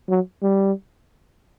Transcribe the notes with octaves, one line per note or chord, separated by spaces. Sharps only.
F#3
G3